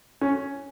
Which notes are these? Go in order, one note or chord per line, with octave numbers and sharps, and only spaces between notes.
C#4